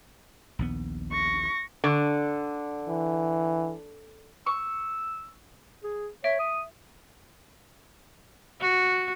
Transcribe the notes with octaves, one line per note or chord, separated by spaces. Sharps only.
A#1 D#2 B3
C#6 A#6
D3
E3
C#6 E6
G#4
C#5 E5 B6 D7
D#6
F#4